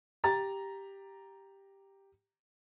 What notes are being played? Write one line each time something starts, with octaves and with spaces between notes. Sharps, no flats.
G4 A#5 A6